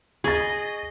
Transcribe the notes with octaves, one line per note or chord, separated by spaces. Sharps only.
G#4 D#5 C#6 A6